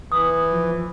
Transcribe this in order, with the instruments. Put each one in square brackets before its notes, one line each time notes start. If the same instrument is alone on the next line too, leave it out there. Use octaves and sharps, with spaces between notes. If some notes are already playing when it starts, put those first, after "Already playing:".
[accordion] E3 [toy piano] D#6
[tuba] F3